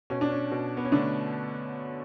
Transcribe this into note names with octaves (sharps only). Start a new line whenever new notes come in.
B2 C#4
D4
C#4
B2
B3
C#4
D3 A3 D4